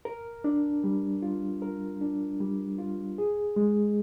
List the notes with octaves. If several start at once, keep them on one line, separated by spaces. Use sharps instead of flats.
A#4
D4
G3
F4
A#4
D4
G3
F4
G#4
G#3